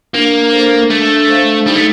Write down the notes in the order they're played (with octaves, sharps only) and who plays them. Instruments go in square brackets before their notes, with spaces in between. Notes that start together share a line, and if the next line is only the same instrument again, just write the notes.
[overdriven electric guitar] A#3 [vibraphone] D4
[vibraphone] A4 C5
[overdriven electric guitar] A3 [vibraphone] D4
[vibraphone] A4 C5 F5
[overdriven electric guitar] G3 [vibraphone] D#4
[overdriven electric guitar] A3